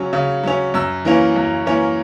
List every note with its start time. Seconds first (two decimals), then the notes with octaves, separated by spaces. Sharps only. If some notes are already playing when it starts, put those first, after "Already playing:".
Already playing: C#3 F#3 C#4
0.13 C#3
0.43 F#3 C#4
0.74 F#2 E6
1.05 E3 A#3 C#4
1.36 F#2
1.66 E3 A#3 C#4